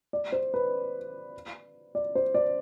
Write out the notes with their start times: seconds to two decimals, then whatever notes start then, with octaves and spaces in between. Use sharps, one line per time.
0.13 D5
0.32 C5
0.54 B4
1.95 D5
2.15 C5
2.34 D5